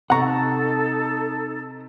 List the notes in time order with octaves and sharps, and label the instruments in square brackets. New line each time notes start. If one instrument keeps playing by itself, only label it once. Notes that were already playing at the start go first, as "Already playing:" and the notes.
[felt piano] C3 C#6 [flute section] D#4 A4 [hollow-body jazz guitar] F#5 A#5